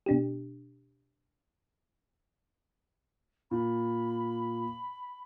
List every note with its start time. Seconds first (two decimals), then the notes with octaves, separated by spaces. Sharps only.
0.06 B2 D4 G4
3.51 A#2 B5